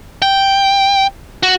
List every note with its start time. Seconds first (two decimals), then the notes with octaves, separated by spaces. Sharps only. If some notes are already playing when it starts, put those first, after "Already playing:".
0.22 G5
1.43 F#4